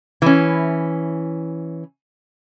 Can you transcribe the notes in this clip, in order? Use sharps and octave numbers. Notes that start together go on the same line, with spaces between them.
E3 C#4